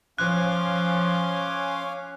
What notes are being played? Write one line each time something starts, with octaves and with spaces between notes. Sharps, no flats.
F3 C#4 C#5 F5 G#5 C6 D6 F#6